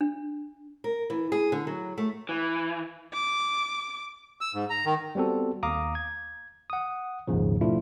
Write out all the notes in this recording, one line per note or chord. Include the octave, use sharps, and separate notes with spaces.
D4
A#4
E3
G#4
D3
F#3
A3
E3
D6
E6
G#2
A#5
D#3
G3 B3 C4 F#4 A4
D#2 F5 A#5 D6 D#6
G#6
F#5 D#6
A#1 D#2 G#2 C#3 F3
B2 F3 A3 D4 E4 F4